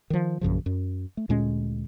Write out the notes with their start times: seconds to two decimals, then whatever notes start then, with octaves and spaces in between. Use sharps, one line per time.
0.10 D#3 F3
0.41 A#1 F#2 C#3 F3
0.66 F#2
1.17 A3
1.29 D2 A#2 G#3 C#4